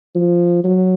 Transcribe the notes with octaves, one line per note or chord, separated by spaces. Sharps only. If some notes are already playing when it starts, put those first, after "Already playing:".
F3
F#3